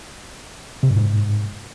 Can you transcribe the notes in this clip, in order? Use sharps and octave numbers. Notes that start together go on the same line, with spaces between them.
C3
G2
G#2